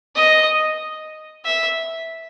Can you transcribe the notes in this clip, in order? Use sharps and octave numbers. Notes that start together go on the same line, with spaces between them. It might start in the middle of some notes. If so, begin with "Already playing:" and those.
D#5
E5